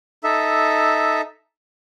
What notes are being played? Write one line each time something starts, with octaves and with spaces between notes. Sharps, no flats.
D#4 A4 E5